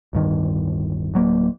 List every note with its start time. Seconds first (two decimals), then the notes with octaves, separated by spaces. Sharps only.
0.13 D1 G2 D#3
1.14 D1 F#3 A#3